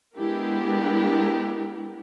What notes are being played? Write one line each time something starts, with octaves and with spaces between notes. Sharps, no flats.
G#3 B3 D4 E4 G4 A#4